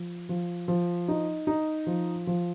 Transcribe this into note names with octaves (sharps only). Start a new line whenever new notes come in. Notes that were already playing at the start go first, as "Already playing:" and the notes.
Already playing: F3
F3
F3
D#4
D#4
F3
F3